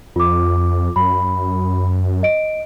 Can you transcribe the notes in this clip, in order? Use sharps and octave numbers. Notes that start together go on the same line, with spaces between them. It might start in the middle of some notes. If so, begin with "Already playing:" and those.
F2 F4 D6
F#2 B5
D#5 D7